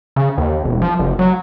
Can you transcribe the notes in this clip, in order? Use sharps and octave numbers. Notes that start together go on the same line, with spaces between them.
C#3
D#2
E1
F3
F#1
F#3